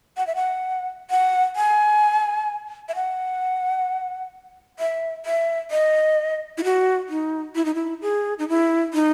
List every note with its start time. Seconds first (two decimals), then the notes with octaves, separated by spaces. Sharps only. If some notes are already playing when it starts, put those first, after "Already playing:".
0.17 F#5
0.27 E5
0.36 F#5
1.10 F#5
1.56 G#5
2.89 E5
2.95 F#5
4.79 E5
5.26 E5
5.71 D#5
6.58 E4
6.64 F#4
7.09 D#4
7.55 E4
7.65 D#4
7.75 E4
8.02 G#4
8.39 D#4
8.49 E4
8.94 D#4